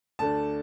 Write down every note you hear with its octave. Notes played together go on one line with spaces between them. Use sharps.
D2 D3 A3 D4 A5